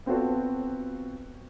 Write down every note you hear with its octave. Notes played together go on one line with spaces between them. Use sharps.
B3 C4 F4 F#4 A4 C5